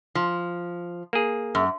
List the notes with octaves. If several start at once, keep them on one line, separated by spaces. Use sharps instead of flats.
F3
A#3 G#4
F#2